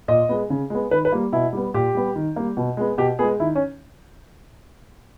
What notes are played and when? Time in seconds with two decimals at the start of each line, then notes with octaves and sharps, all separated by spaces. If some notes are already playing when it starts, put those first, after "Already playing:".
0.08 A#2 D#5
0.29 G#3 B3
0.50 C#3
0.70 G#3 B3
0.91 D#3 B4
1.05 B4
1.12 G3 A#3
1.33 B2 E4
1.53 G3 B3
1.74 A#2 G4
1.95 G3 B3
2.16 D#3
2.36 G3 A#3
2.57 B2
2.77 G#3 B3
2.98 B2 G4
3.19 B3 G#4
3.23 G#3
3.40 D#3 E4
3.55 C#4